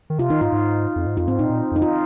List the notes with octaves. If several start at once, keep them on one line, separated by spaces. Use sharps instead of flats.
D#3
C3 F4
D#3 D#4
G#2 F4
G#2
F2
G#2
F2 F4
G#2 C4
A#2 D#4
A#2
F2 D#4
F4